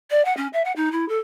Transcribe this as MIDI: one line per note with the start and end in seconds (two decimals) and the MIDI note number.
0.11 0.24 74
0.25 0.35 78
0.37 0.48 61
0.53 0.62 76
0.65 0.72 78
0.76 0.89 63
0.92 1.08 64
1.09 1.18 69